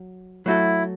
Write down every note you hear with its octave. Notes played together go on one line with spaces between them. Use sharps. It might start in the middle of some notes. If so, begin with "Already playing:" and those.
Already playing: F#3
F#3 A3 E4 F#4 A4